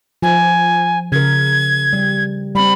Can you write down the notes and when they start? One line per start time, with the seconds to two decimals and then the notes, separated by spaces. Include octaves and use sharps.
0.22 F3 G#5
1.12 C#3 A#4 G#6
1.93 G3
2.55 G3 C4 B5